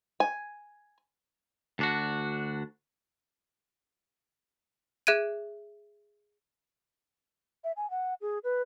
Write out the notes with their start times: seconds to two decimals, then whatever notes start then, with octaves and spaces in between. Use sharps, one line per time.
0.20 G#5
1.79 D2 D4 F#4
5.07 G#4 E5 F#6 G#6 D7 D#7
7.64 E5
7.77 G#5
7.90 F#5
8.21 G#4
8.44 B4